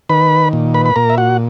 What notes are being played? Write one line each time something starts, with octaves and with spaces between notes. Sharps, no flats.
D#3 B4 B5
A#2
B4 B5
B5
A#2 A#4 A#5
E5
F#4 F#5